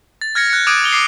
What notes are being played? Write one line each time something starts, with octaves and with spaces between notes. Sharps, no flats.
A6
F6 G#6 A#6 C#7
F#6 C#7
D6 D#6 F#6 G#6 D7 D#7
D6 A6 F7 G7
D6 C7